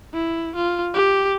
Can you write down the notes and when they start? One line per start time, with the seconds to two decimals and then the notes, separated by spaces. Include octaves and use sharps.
0.14 E4
0.56 F4
0.94 G4